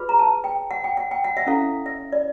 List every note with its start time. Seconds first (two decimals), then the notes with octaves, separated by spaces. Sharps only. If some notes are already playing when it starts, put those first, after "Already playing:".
Already playing: F4 G#4 B4
0.09 A#5
0.19 A5
0.44 G5
0.71 F#5
0.84 G5
0.97 F#5
1.11 G5
1.24 F#5
1.37 E5
1.47 C#4 E4 A4 F5
1.86 E5
2.12 D5